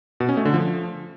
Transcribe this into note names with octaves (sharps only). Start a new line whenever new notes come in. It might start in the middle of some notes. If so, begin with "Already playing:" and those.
B2
C#4
A3
D3
F3